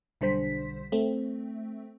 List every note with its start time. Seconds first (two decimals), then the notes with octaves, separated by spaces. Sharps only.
0.21 B1 D3 G3 C5 B6
0.92 A3 C4